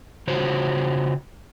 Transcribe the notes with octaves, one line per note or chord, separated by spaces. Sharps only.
C#3 F4 F#4 C5 C#5